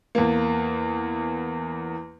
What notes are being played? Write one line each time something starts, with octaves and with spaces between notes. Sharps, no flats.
E2 A#3